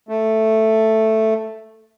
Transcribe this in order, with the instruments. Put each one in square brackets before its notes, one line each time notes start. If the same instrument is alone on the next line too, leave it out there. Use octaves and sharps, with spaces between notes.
[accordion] A3